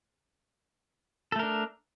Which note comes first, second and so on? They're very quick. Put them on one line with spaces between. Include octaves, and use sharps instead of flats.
A4 A3 A#4 D4